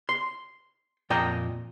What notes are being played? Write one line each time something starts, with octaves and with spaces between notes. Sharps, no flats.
C6
F2 A#2 A#3 D#5 G5 A#5